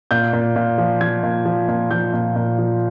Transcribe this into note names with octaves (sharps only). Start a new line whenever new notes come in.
A#2 G6
A#2
A#2
F3
F3 G#6
A#2
F3
A#2
F3 G6
A#2
A#2
F3